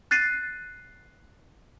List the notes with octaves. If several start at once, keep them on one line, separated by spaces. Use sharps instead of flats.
F#6 A6 C7 D#7